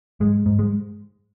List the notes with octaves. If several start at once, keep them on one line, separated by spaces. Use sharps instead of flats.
G#2 G#3
G#2
G#3